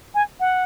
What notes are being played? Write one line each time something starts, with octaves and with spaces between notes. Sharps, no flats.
G#5
F#5